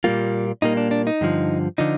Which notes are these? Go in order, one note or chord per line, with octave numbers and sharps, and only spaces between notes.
A#2 G3 A#3 F4
A#2 G3 A#3 D#4
D4
D4
D#4
G2 D3 F3
D3 F3 D#4